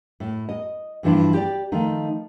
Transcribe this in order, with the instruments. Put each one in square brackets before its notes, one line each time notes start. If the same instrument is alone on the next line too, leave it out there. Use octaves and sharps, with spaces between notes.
[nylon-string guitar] A2
D#5
G2 E3 F3 D4 E4 F4
G4 D5
D#3 F3 A3 D#4